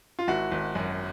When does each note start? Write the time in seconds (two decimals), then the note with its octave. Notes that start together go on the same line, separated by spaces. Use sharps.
0.19 F4
0.28 G#1 E4 F#4
0.51 G#1
0.75 F#2